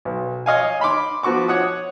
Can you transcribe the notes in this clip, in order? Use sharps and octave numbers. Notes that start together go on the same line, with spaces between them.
B1
C#5 D#5 F5 G#5
D#5 B5 C6 D6
F3 B3 F#4 C#6 D6
C#5 F#5 D#6